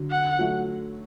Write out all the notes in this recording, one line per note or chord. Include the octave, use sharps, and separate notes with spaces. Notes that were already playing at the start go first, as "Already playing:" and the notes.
Already playing: D3 F#3
F#5
F#3 A3